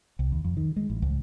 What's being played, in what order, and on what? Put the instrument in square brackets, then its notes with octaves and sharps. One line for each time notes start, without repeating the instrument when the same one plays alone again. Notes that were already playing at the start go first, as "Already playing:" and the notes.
[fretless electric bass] C2
D#2
F2
D#3
G#3
A1
C#2